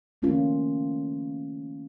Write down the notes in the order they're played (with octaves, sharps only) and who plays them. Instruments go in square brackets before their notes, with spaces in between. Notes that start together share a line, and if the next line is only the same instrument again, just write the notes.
[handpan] D#3 A3 A#3 C#4 F4